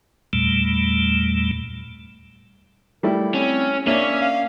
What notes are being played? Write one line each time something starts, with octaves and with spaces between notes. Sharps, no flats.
E2 A#2 G3 A3
G3 A3 E4 A#4
C4 C#4
A#3 C#4 D4 E5
F5